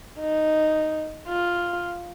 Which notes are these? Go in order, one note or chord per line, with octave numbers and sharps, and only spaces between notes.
D#4
F4